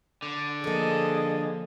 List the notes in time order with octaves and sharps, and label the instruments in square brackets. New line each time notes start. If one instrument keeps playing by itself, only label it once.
[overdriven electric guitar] D3
[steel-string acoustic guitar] F3 A#3 [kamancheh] G#4 D#5 [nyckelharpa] A4